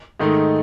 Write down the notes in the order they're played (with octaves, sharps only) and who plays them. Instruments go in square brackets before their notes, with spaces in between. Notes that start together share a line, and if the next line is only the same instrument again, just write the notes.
[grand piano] G#2 D#3 A3 D#4